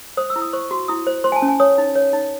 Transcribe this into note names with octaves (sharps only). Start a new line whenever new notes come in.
C5 D#6
E6
E4
D#6
C5 C#6
F#4
E4 D#6
C5
C5 C6
G#5
A5
C#4
G#5
C#5 D#6
D#4
C#5
D#4